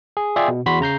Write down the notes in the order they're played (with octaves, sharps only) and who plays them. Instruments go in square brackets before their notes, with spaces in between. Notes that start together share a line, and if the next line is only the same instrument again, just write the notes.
[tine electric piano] G#4
F4 G#4 D5 E5 G5
B2
E2 F#4 B5 C6 B6
C#3 A#5 G6 C7